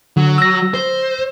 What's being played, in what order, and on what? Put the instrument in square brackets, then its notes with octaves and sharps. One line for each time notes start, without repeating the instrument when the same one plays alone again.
[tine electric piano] D3 [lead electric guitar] F#3
[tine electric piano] E6 A#6
[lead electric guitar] C5